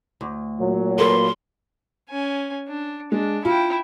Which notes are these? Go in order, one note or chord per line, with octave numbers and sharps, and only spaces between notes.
D2
A#2 F#3
A#3 A4 B4 C6
C#4 G#5
D4
G#3 D4
E4 F4 G5